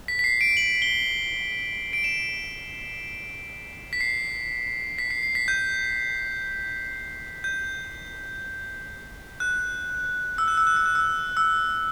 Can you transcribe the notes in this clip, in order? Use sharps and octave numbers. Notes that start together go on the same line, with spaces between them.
B6
B6
C7
D7
F#7
G7
D7
E7
B6
C7
B6
C7
C7
B6
G6
G6
F#6
E6
F#6
E6
F#6
E6
F#6
E6
E6